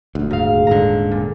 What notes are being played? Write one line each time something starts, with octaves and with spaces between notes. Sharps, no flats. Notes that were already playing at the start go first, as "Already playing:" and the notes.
D#1 D2
G#2 F5
D#1 G#2 D3 A#5
A#2